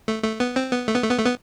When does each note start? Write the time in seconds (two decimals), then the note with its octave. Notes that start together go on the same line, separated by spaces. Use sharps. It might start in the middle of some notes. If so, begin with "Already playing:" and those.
0.08 A3
0.24 A3
0.40 B3
0.56 C4
0.72 B3
0.88 A3
0.96 B3
1.03 A3
1.11 B3
1.19 A3
1.26 B3